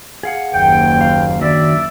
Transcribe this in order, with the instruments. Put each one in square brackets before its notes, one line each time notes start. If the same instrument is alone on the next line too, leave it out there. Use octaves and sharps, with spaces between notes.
[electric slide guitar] G#4 F5 F#5
[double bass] F#1 D#2 [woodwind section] G5
[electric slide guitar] F5
[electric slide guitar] D#3 F#3 D4 [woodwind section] D5 E5